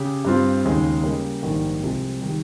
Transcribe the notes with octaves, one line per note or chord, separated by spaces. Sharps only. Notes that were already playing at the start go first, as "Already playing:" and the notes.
Already playing: C#3 G4
G2 G3 C4 F4
D#2 C#3 G#3 D#4
C#3 G3 A#3
A#1 G#2 D#3 G3 A#3
C2 C3 F3 G#3
D#3 G3